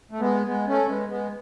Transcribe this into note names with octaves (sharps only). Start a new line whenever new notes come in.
A3
G#3 B3
G#3 B3
A3 C#4
G#3 B3
G#3 B3